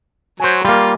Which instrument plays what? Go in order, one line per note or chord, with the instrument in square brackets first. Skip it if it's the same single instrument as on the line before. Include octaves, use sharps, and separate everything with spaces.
[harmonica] F#3 [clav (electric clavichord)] C5 G#5
[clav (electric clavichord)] G3 A#3 [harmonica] F4